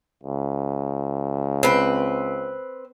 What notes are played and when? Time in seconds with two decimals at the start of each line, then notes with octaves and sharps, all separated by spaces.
0.23 C#2
1.63 C4 B4